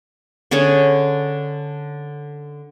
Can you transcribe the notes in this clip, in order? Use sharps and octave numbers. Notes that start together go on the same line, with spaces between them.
D3 C#4 G#4 C#5